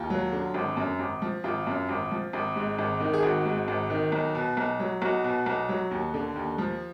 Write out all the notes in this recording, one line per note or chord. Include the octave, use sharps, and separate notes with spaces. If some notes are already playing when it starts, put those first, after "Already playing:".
Already playing: D#2 F4
F#3
D3
G#1
F#2
G#1
F3
G#1 F4
F#2
G#1
F3
G#1
G#2
G#1
D#3
G#4
G#1 F#4
G#2
G#1
D#3
B1
B2
B1
F#3
B1 F#4
B2
B1
F#3
D#2
D3
D#2
F3